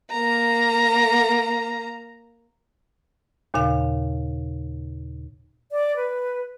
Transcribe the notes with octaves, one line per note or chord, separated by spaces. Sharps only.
A#3 A#5
D#2 A#2 C#3 F5
D5
B4